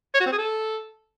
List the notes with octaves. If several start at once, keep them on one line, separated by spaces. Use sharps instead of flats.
C#5
F#4
C4
G#4
A4